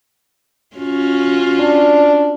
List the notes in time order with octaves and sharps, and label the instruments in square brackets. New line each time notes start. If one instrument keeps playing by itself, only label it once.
[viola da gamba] C#4 F4 F#4
[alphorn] D4